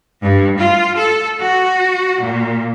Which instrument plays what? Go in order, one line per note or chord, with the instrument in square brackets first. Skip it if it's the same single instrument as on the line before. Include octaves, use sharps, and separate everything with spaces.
[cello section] G2
F4
A4
F#4
A#2